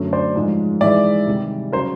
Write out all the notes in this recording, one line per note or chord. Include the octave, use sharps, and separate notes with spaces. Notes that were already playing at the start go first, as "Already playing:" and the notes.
Already playing: F#2 D3 F#3 A3
C5 D5
G#2 F3 G#3
G#2 E3 G#3 D5 E5
C3 D#3 G3
C#3 F#3 A#4 C5